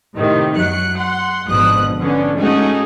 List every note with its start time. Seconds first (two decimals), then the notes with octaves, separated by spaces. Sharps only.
0.14 A2 C3 D#3
0.55 F#2 F#3 F#6 C#7
0.96 F#5 C6
1.46 G#1 B2 D3 F3 D#6 F#6
1.98 D3 B3 C#4 D4
2.36 G#3 A3 C#4 D#4 F#4 G#4